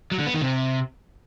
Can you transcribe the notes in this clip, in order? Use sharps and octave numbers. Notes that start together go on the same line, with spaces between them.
F#3
D3
B3
D#3
C3